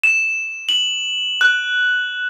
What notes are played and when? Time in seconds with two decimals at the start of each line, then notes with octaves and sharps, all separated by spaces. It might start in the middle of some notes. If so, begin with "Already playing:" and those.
0.04 E7
0.69 F#7
1.41 F#6